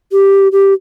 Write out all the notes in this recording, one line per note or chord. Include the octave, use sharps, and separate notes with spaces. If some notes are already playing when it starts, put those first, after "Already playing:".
G4
G4